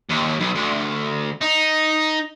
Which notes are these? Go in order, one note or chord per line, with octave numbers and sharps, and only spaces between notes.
D#2
B1
D2
D#4